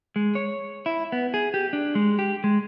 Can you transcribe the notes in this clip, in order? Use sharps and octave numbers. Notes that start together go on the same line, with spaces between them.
G#3
C#5
E4
B3
G#4
G4
D4
G#3
G4
G#3